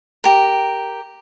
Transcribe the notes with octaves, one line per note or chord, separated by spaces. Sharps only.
G4 A#4